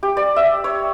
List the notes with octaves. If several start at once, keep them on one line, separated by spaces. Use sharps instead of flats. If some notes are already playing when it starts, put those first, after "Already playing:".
G4
D5
E5
C#5